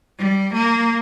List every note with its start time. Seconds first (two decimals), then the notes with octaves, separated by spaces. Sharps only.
0.18 G3
0.54 A#3